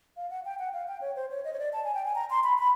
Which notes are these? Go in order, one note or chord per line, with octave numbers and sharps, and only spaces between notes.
F5
F#5
G5
F#5
F5
G5
C#5
C5
C#5
D#5
C#5
D5
A5
G#5
G5
G#5
A#5
C6
B5
B5